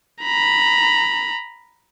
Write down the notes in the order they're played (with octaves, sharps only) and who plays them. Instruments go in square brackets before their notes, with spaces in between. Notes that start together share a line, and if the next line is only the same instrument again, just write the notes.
[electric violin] A#5 B5